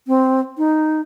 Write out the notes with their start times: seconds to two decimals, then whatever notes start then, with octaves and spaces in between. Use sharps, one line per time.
0.08 C4
0.58 D#4